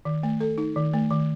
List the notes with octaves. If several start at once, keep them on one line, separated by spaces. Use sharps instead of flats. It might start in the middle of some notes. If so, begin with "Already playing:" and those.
D#3
A3
A4
D#4
D#3
A3
D#3